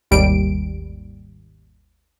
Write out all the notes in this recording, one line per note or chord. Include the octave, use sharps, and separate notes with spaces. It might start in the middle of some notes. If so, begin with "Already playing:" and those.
G#1 D#2 G3 D7